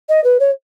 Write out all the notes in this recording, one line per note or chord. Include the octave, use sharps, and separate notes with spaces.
D#5
B4
C#5